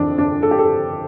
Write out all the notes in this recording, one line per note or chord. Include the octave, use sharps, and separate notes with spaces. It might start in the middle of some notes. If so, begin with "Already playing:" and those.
Already playing: F2 E3 C4 D4
D4
A4
G4
A4